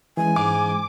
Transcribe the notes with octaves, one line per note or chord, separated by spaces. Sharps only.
E3 G#3 C#4 G#5
G#2 D6